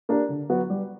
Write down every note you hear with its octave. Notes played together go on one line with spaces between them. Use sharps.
A#3 D4 G4
D3
F#3 B3 F#4
G3